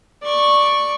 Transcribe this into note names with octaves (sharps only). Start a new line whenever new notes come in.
D5 C#6